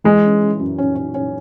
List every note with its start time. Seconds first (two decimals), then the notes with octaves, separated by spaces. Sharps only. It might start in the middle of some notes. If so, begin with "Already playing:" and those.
0.04 E3 G#3
0.23 C#4
0.41 C#4
0.59 F#2
0.78 C#4
0.95 C#4
1.14 C#4